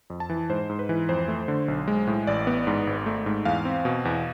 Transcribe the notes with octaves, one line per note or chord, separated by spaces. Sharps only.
F2
A5
E3
G#2 C5
G#2
B4
E3
F2 C5
A3
D3
B1
G#3
A2
A1 D5
B3
G#2
G#1
A3
G#2
E2 F5
C4
B2
E2